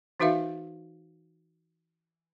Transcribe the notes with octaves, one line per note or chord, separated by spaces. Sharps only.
E3 D#4 F#4 B4 E5 F5